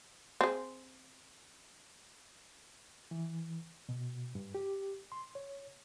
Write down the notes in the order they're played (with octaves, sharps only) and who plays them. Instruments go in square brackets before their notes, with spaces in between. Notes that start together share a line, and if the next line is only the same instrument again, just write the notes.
[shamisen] C4 G#4
[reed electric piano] E3
B2
G2
G4
C6
C#5